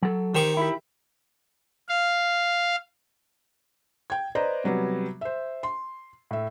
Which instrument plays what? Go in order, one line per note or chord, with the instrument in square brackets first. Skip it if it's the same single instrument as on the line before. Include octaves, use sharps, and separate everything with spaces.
[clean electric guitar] F#3 A4
[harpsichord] D#3 C#6 D6 [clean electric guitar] G4 C5 G5
[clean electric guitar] E4 G4
[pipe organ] F5
[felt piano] G5 G#6
B4 C5 D5 D#5 A#5
C3 F#3 G3 B3
C5 E5
C6
A2 E5